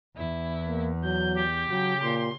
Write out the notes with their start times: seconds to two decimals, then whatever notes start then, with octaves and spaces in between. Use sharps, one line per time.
0.17 E2 E4
0.68 A#3
1.04 F#3 G6
1.37 G4
1.70 C#3 F#3 G5
2.03 A#2 C6